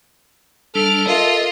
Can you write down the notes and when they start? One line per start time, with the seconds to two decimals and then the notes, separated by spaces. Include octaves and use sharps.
0.75 G3 D4 A4 F6
1.07 F4 A#4 D#5 E5